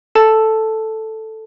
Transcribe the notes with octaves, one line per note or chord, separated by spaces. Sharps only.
A4 A5